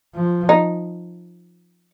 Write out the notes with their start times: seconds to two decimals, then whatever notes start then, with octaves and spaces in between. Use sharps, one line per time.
0.15 F3
0.49 D#4